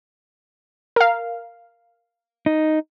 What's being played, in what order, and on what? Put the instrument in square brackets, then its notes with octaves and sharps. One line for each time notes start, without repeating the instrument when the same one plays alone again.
[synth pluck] A#4 F5
[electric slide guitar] D#4